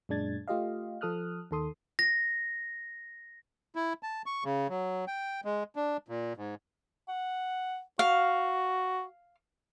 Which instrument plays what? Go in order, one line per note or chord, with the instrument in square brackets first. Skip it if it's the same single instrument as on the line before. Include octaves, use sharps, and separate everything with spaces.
[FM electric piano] F#2 A#2 G#3 D4 G#6 A6
A3 F4 G4 D#5 F5
F3 A4 D#6 F6 F#6
D#2 D#3 A4 C6 D#6
[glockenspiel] A#6
[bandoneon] E4
A5
C#6
C#3
F#3
G5
G#3
D4
A#2
G#2
[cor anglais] F#5
[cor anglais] F#4 [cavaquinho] F5